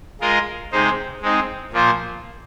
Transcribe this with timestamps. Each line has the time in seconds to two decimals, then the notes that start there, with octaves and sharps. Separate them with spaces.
0.21 G#3 F4 A#4 D#5
0.72 C3 G#3 D#4 C5
1.22 G#3 C4 D#4
1.72 A#2 F3 A#3 F4 C5